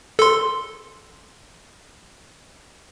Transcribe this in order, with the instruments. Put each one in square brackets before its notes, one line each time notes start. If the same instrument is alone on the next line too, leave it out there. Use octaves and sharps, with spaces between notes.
[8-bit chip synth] A4 C6